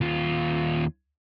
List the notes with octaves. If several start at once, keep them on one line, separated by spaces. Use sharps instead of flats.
D#2 F4